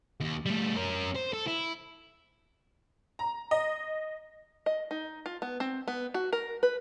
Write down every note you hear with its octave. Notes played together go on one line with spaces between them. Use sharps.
D#2
G3 A3
C#4 A#4
C5
A4
E4
A#5
D#5
D#5
D#4
F4
B3
C4
B3
F#4
A#4
B4